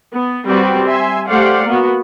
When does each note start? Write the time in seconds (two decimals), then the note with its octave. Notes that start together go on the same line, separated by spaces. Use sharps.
0.13 B3
0.47 G3 C4 F#4 B4 D5
0.87 E5 G#5 C6
1.29 A3 G4 C5 D5 F5 F#5
1.65 A#3 B3 F#4